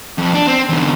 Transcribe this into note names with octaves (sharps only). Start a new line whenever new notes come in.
F2
D4
C4
E2 D3